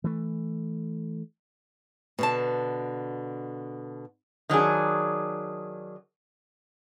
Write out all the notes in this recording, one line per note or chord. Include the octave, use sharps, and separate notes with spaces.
E3 A3
B2 D3 A5
D#3 F#3 D4 G#4